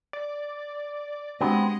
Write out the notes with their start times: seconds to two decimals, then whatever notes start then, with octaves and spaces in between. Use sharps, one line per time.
0.13 D5
1.41 G#3 B3 C4 D4 F#4 G4 D#5